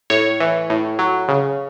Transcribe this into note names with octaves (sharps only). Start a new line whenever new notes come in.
A2 C#5
E3
A2
F#3
C#3